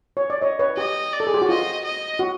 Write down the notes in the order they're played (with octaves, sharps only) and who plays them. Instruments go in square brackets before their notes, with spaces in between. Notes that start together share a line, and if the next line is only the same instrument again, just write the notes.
[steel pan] C#5
D5
C#5 D#5
B4 C#5
[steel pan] G4 [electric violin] D#5
[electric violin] D5
[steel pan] A4
G#4
G4
F#4
[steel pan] F4 [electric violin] D#5
[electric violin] D#5
[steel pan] F#4